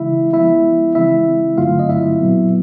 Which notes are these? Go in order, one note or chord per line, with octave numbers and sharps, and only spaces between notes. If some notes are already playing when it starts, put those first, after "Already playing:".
Already playing: C#3 E3 G#3 E4 E5
F3 G#3 B3 E4 E5
C#3 E3 G#3 C4 E4 E5
G2 D3 F#3 A3 C4 F4 F5
D#5
E4 E5
A#2 F#3 B3